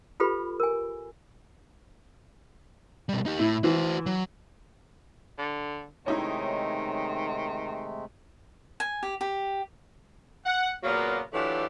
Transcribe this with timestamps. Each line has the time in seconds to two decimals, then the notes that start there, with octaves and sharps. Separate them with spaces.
0.20 F4 G4 A4 B4 B5
0.60 A#4 G#5
3.09 B2 G3
3.26 D#4 G4
3.39 A2 E4
3.64 E3 F#4 C5
4.06 F#3
5.39 D3
6.06 C3 D#3 G#3 A3 C#4 D#4 E4
8.80 G#5
9.03 G4
9.21 G4
10.46 F#5
10.84 A#2 C#3 F#3 A#3 B3 F4
11.33 E3 F#3 A3 D4 F4 G4